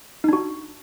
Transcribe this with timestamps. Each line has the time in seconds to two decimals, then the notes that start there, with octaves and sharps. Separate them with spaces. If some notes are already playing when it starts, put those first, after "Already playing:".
0.24 D#4
0.28 D4
0.33 F#4